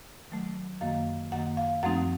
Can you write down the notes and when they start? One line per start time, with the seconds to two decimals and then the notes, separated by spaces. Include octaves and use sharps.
0.30 D#3 F#3 A3
0.81 F#2 D#3 A#3 F5
1.32 F#2 D#3 A#3 F#5
1.57 F5
1.83 F#2 F3 A3 C4 D#4 F#5